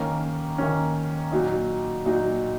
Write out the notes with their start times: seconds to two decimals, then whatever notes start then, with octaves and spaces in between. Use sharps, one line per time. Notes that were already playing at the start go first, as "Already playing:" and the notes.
Already playing: D#3 A#3 C#4
0.58 D#3 A#3 C#4
1.32 A#2 F#3 D#4
2.06 A#2 F#3 D#4